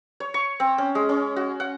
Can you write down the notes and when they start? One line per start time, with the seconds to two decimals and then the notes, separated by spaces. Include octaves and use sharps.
0.20 C#5
0.34 C#6
0.60 C4
0.78 C#4
0.95 G#3
1.09 C#4
1.36 F#4
1.60 F#5